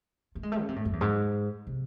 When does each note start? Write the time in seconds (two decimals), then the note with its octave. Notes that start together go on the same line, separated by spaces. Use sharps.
0.35 A3
0.43 G#3
0.52 A3
0.60 C#3
0.68 C3
0.76 A2
0.85 F#2
0.93 E2
1.01 G#2
1.67 C3